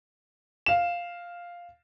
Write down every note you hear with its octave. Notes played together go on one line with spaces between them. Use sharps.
F5 E7